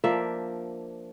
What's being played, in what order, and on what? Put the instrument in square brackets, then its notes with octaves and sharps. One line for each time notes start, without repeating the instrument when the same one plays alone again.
[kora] F3 A#3 D4 E5